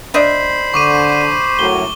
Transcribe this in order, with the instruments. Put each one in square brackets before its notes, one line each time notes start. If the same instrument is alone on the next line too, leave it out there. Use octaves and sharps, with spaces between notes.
[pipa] D4 D#5 E5 [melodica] C5 B5
[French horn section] D3 [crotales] C#6 D6 D#7
[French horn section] F#2 A2 F#3 [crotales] G7